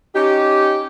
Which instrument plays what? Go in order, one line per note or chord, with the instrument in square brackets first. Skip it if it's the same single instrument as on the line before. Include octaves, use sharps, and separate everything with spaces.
[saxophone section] C#4 D#4 G4